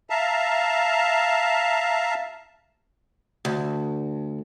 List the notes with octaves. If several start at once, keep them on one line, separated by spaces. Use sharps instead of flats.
E5 F5 A5 A#5
D2